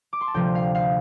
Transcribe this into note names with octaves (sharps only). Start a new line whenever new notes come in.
D6
C6
A5
D2 C3 F3 G5
F5
F5